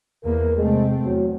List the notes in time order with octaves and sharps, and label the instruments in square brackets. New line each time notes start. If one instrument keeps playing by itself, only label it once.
[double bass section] E2 A#3 [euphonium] A#4
[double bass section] C3 A3 C4 [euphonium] G#3
[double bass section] E2 [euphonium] F#3